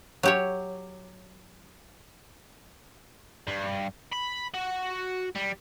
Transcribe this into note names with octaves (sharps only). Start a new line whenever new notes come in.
F#3 G4 C#5
G2
B5
F#4
G3